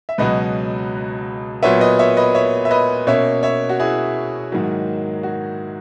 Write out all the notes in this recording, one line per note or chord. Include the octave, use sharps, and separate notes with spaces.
E5
C#2 B2 F#3 B4 D#5
A#2 F#3 B3 C#5 E5
B4 D#5
C#5 E5
B4 D#5
C#5 E5
E5
B4 D#5
B2 A#3 C#4 C#5 E5
C#5 E5
F#4
E4 G#4
G#2 D#3 F#3 A#3
F#4